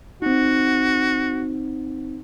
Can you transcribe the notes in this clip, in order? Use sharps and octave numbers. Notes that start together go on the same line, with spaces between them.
C4 D#4 F#4